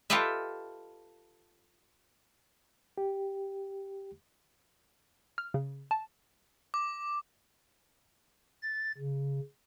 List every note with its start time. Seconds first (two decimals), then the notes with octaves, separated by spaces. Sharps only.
0.10 F4 G4 A4 B4 D#5 E5
2.98 G4
5.38 F6
5.54 C#3
5.91 A5
6.74 D6
8.62 A6
8.98 C#3